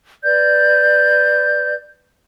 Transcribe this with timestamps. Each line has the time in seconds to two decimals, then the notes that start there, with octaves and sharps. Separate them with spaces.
0.23 B4 D5 G6